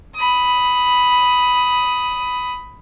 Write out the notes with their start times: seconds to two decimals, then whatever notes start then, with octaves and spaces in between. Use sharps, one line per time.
0.15 B5 D#6